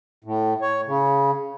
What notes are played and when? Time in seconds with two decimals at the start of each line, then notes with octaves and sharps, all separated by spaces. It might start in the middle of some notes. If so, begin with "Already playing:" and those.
0.24 A2
0.62 C#5
0.87 C#3